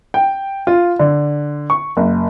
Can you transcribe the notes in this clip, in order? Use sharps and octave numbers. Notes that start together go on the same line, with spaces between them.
G5
F4
D3
C#6
F#1